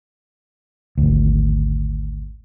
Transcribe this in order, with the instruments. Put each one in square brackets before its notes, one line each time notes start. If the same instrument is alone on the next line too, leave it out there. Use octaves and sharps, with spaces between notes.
[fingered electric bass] G#1 D2